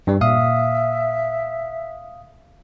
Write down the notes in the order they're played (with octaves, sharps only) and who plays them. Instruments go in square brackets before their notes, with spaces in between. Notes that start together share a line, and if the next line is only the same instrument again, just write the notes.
[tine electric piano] G2 G3
[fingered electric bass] A#2 [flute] E5 [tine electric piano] F5 D#6